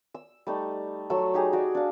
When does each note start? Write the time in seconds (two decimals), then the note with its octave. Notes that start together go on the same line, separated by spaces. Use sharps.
0.14 E6
0.47 G3 A3 D#4
1.10 F#3 A3 C#6 E6
1.34 D#4 G4 G#4 A#5
1.53 F#4 D5
1.75 D4 F5